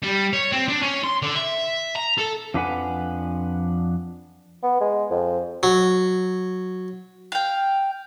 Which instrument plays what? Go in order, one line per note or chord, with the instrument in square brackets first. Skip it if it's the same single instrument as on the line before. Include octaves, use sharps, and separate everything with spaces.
[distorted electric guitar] G3
C#5
C4
D4
C#4
C6
D3
E5
A#5
A4
[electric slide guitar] F2 F3 D4 B4 F#5 G#5
[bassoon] B3
G#3
F2
[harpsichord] F#3
[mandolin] F5 G5